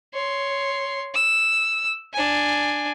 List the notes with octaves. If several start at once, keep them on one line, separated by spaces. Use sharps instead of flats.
C#5 C6
E6
D4 G#5